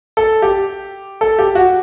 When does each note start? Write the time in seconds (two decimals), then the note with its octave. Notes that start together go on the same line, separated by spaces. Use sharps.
0.17 A4
0.42 G4
1.21 A4
1.39 G4
1.55 F#4